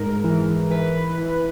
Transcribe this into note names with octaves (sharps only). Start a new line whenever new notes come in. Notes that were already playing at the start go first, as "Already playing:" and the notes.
Already playing: G#2 A#4
E3
E3 B4
E3